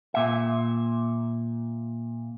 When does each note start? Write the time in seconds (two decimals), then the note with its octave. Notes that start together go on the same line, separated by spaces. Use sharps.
0.14 A#2 E5